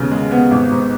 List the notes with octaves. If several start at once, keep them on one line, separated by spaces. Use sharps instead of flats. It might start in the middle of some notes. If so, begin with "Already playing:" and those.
Already playing: D#2 C#3 G#3 B3
G#3
B3
G#1
G#2